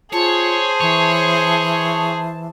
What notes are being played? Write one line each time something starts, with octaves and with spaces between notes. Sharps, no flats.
F4 G#4 C5 C#5 A5
E3 C#5